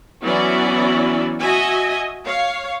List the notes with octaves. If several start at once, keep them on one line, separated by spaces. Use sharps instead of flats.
E3 F#3 B3 C#4 E4 D5
F#4 D#5 E5 G#5
C#5 F5